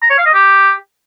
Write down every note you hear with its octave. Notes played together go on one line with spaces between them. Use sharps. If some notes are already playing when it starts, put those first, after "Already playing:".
A#5
C#5
F5
D#5
G4